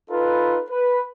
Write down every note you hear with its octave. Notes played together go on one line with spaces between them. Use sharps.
D#4 F4 A4 B4
B4